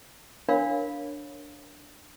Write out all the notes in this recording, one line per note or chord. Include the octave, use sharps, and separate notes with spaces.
D4 A#4 C#5 F5 B5